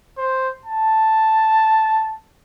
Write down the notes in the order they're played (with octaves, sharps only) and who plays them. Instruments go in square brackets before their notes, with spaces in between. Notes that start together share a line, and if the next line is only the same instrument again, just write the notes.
[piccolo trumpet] C5
A5